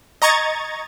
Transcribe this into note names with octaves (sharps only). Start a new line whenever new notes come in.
D#5 A#5 C#6 G#6 A6